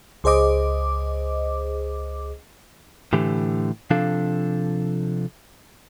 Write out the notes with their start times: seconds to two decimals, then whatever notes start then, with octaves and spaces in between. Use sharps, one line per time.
0.24 C#2 G#4 C5 D#5 D6
3.13 A2 D3 E3 G4
3.90 C3 F3 D4 A4 F5